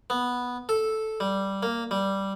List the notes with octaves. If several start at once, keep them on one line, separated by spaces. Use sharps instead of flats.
B3
A4
G3
A#3
G3